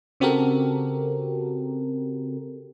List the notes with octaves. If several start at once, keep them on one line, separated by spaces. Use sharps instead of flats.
C#3 C4 F#4 G4 A4 A#4